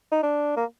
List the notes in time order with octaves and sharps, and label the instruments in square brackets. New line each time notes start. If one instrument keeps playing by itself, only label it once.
[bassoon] D#4
D4
A#3